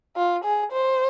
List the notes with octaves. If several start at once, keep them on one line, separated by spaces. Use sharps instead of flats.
F4
G#4
C5